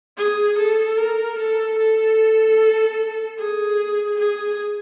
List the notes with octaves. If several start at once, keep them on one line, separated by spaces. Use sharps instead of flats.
G#4
A4
A#4
A4
A4
G#4
G#4